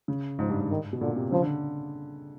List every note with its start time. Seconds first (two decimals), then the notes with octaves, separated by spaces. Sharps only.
0.08 C#3
0.39 G#2 F3
0.50 G2
0.60 G#2
0.70 D#3
0.93 B2
1.01 A#2 D3
1.16 C3
1.32 C#3 F3
1.42 D3